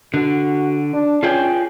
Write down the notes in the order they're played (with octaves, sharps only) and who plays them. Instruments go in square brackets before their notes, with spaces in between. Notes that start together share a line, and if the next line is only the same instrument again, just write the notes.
[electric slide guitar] D3 [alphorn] F#4
[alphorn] D4
[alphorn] C#4 [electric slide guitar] F4 G#4 G5